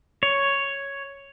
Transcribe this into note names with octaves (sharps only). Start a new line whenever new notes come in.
C#5